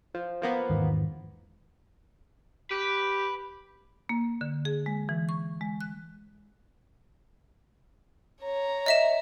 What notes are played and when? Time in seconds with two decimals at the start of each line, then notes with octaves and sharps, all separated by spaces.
0.14 F3
0.42 F3 A#3 B3
0.70 E2 G#2 D#3
2.71 G4 B4
4.09 A#3
4.41 D3
4.65 G#4
4.86 G#3
5.09 E3
5.29 C#6
5.61 G#3
5.81 F#6
8.43 C#5 A#5
8.86 D#5 E5 E7